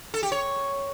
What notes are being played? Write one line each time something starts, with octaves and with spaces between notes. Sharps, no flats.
A4
G4
C#5